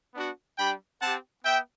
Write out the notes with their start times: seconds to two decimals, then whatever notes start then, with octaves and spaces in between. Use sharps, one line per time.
0.14 B3 D4 F#4
0.58 G3 D4 G4 G5 B5
1.02 C4 G4 F#5 A5
1.45 B3 E5 G5